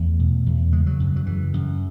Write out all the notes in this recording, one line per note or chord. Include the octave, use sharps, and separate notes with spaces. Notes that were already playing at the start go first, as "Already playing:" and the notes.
Already playing: E2 A3
B2
E2
C#3 G#3
F#3
F#2
F#3
C#3 E3
F#2